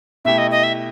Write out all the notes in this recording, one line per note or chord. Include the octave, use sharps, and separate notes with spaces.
B2 A3 E4 G4 E5
D#5
D#5
E5